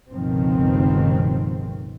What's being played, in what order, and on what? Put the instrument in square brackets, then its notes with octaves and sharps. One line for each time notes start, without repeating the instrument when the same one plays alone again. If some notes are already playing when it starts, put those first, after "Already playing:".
[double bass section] G1 C#2 B2 D#3 F3 C4